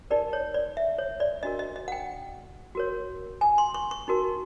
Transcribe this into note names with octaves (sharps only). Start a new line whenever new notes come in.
D#4 G4 A#4 D5
C#5
D5
E5
C#5
D5
D4 F#4 A#4 D#5
D#5
D#5
F#5
G5
F#4 A#4 C#5
G#5
C6
C#6
C#6
D#4 F#4 A#4